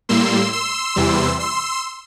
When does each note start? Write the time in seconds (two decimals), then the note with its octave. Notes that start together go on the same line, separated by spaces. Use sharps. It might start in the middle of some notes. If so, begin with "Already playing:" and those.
0.09 A2 G3 A#3 C6 E6
0.53 C6 E6
0.96 E2 C3 E3 G3
1.40 C6 E6